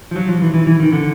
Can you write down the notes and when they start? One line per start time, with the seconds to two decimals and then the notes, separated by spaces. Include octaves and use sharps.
0.11 F3
0.16 F#3
0.29 F3
0.42 E3
0.54 E3
0.67 E3
0.80 D#3
0.92 D3